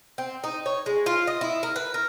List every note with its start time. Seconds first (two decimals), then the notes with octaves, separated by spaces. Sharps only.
0.18 C4
0.44 D#4
0.66 C#5
0.86 G#3
1.06 F4
1.27 D#5
1.41 E4
1.63 A#4
1.76 B4
1.94 A#4